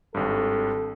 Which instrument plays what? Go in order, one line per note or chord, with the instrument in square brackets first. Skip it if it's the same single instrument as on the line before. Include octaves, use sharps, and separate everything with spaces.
[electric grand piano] G#1 G2 [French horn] A4